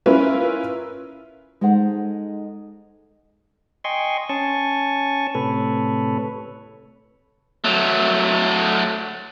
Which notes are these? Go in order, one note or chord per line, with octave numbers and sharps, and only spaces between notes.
C#4 E4 F4 A#4 B4
G#3 D#4 A4 C5 F#5
D#5 G5 G#5 C6 C#6
C#4 G#5 A5 C#6
A2 C3 A4 B4 C#5
F#3 A3